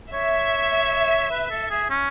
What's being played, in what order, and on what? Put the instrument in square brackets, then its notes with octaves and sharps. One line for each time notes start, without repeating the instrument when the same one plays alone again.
[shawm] C#5 [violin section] E5
[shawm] B4
A4
G#4
C#4